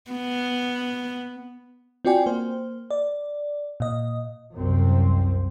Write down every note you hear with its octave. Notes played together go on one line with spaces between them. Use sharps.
B3
C4 F4 F#4 D5 G5 G#5
A#3 C5
D5
A#2 D#5
C2 F#2 C4